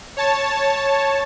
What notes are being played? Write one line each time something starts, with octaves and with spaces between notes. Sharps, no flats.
C#5 A5